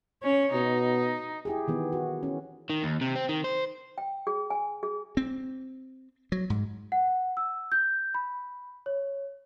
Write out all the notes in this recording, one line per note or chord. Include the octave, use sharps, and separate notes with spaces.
C#4 C#5
B2 D#4
E4 G4 G#4
D#3 E3 B3
F#4
C#4
D#3
D#2
C3
C4
D#3
C5
G5
G#4
G#5
G#4
C4
F#3
G#2
F#5
E6
G6
B5
C#5